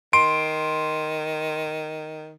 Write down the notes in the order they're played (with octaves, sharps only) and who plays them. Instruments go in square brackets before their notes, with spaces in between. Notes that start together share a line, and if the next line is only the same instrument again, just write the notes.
[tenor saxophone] D#3 [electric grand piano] C6 D7